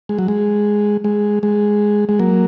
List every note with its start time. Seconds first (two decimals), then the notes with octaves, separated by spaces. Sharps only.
0.09 G#3
0.19 F#3
0.28 G#3
1.04 G#3
1.43 G#3
2.09 G#3
2.19 F#3 A#3